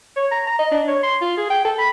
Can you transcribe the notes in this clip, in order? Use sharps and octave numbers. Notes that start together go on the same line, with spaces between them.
C#5
A#5
A#5
D#5
D4
C#5
C6
F4
G#4
G5
A4
B5